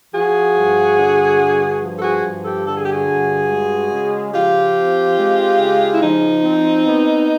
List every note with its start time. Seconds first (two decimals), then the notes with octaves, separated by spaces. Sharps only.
0.13 F3 F#4 G#4
0.55 G2
0.97 D3
1.39 G2
1.81 F3
1.98 A4
2.02 F#4 G#4
2.24 G2
2.44 G4 A4
2.65 D3 A4
2.75 G#4
2.84 G4
2.92 F#4 G#4
3.07 G2
3.50 G#3
3.91 C#3
4.34 F3 F4 G4
4.76 C4
5.18 G#3
5.59 C#3
5.93 E4
6.01 F3 D#4
6.44 C4
6.85 B3